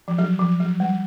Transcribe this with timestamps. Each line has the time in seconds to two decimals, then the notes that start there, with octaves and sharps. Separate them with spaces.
0.08 F3
0.18 F#3
0.39 F3
0.60 F#3
0.80 G3